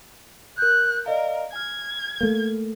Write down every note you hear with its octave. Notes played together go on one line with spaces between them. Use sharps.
A#4 F#6 G6
A#4 D5 D#5 F5
G#5 F6 G#6
A3 A#3